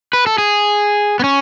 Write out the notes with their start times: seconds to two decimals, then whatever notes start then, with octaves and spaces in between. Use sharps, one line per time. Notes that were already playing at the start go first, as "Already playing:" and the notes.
0.13 B4
0.27 A4
0.38 G#4
1.19 B3
1.24 C#4